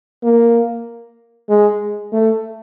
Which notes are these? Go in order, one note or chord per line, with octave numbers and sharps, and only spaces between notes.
A#3
G#3
A3